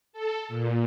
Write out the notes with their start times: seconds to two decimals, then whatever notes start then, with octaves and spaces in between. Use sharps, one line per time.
0.13 A4
0.48 A#2